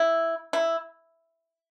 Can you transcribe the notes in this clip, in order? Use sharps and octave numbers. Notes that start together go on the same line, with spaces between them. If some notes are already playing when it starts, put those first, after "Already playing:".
Already playing: E4
E4